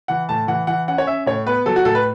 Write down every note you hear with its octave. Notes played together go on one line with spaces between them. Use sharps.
E3 F#5
A2 A5
E3 F#5
E3 F#5
C#4 F#5
C#5
C#4 E5
A2 C#5
B3 B4
F#3 A4
F#4
A2 A4
B4